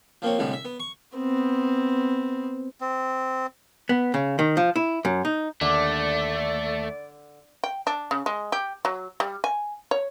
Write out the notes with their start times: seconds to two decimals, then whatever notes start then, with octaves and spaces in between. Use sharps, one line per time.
0.22 F3 A#3 C4 C#5
0.39 C2 A2 D3 G3 G#3
0.53 E5
0.65 B3
0.80 C#6
1.17 B3 C4
2.81 C4
3.89 B3
4.14 C#3
4.39 D#3
4.57 F3
4.76 E4
5.05 F#2
5.25 D#4
5.61 D#2 D3 A3 D5
7.64 G5
7.87 D4
8.11 C#3
8.26 G#3
8.52 G4
8.85 F#3
9.20 G3
9.44 G#5
9.91 C#5